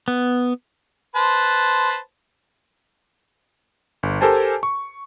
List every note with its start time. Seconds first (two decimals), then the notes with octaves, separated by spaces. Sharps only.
0.08 B3
1.16 B4 C5 A5
4.03 G1
4.21 G4 A4 A#4 C5 G#5 A5
4.63 C#6